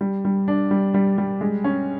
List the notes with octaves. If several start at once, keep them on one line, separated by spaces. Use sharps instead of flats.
G3
G3
D4
G3
G3
G3
G#3
C#4